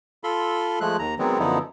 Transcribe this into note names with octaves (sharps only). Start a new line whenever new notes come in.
F4 A4 B5 C6
F3 G#3 A3 F#6
D#2 A#5
D#3 F#3 G#3 B3 C4
F#2 D3 F3 B3 D#4 E4